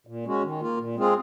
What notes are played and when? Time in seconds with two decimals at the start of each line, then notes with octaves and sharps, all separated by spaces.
0.07 A#2
0.25 G#3 C#4 F#4
0.43 D#3
0.61 A#3 F4
0.78 A#2
0.96 G#3 C4 F4 G#4